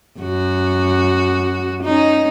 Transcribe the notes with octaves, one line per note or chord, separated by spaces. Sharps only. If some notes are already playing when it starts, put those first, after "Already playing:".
F#2 F#4
C#4 D#4